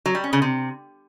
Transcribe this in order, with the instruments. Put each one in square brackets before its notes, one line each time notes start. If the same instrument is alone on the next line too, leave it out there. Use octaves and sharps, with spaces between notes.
[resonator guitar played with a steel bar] F#3
G3
C#4
C#3
C3